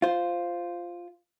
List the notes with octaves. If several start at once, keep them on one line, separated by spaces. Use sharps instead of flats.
F4 C5